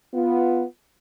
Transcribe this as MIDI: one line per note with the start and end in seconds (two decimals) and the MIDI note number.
0.13 0.65 59
0.13 0.65 65